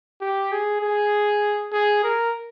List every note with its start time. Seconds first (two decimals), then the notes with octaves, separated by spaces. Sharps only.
0.21 G4
0.52 G#4
0.81 G#4
1.72 G#4
2.03 A#4